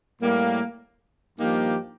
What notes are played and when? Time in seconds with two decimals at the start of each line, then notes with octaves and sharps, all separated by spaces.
0.21 A2 G3 A#3
1.38 G2 F3 A#3 D#4 G4